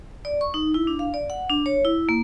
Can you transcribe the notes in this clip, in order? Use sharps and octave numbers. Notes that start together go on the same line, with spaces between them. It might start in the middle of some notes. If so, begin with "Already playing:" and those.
D5
C#6
D#4
E4
D4
F5
D5
F#5
D4
C#5
E4
A#3